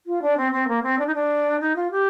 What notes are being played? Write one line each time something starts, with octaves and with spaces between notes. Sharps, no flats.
F4
D4
C4
C4
A#3
C4
D4
D#4
D4
D#4
F4
G4